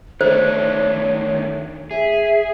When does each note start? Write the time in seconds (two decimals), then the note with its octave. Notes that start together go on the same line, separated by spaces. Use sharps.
0.21 D#3 A3 D4 C5 C#5
1.91 G#4 E5